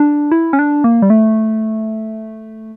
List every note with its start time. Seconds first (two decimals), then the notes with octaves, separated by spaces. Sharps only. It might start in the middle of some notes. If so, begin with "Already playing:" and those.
Already playing: D4
0.32 E4
0.53 C#4
0.59 D4
0.84 A#3
1.02 G3
1.10 A3